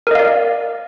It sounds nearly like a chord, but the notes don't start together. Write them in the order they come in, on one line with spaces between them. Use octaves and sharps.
A#4 D#5 F5 D5